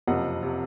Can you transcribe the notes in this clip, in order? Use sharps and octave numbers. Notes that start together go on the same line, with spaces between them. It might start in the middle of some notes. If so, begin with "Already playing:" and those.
F#1 F2 C3 D#5 F#5
C3